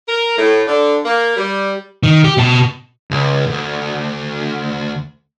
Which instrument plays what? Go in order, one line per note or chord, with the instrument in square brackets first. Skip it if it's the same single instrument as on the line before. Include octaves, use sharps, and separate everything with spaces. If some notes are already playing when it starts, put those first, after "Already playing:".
[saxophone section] A#4
A2
D3
A#3
G3
[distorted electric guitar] D#3
G4
B2 A5
[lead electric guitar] C#2
D2